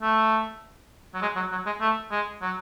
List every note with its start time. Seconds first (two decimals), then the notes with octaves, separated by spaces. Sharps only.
0.02 A3
1.14 F#3
1.22 G#3
1.36 F#3
1.52 F#3
1.66 G#3
1.81 A3
2.11 G#3
2.42 F#3